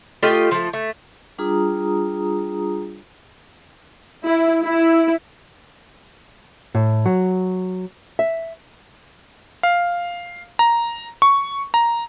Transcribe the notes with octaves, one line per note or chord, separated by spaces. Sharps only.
A3 F4 G4 D#5
F3 A3
A3
G3 D4 F4 G#4 A#5 D#6
E4
E4
A2
F#3
E5
F5
A#5
C#6
A#5